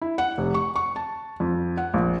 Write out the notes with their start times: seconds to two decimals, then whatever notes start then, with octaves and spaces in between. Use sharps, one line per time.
0.02 E4
0.18 F#5
0.38 F1
0.54 C#6
0.76 C#6
0.96 A5
1.40 F2
1.77 F#5
1.94 A#1